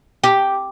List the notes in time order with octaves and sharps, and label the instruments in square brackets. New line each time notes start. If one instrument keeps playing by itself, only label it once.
[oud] G4